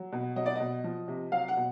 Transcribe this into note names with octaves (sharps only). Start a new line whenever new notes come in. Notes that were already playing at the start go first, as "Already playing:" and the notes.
Already playing: F#3
B2
F#3 D#5
D5
B2 D#5
F3
C3
F#3 F5
F#5
B2